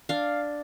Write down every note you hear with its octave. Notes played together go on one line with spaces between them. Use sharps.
D4 F5